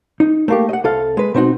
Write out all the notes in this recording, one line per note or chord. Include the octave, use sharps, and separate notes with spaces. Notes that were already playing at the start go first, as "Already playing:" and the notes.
D#4
A3 A#3 G4
D#5 F#5
C2 A4 F5
G#3 B4
B2 C4 D#4 F#4